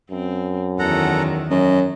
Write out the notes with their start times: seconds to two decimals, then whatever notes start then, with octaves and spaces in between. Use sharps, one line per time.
0.11 F#2 C4
0.79 E2 D#3 A4 F#5 A#5
1.50 F#2 D#5